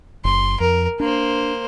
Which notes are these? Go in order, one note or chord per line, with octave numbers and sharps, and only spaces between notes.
F#1 C6
F2 A#4
A#3 D4 C5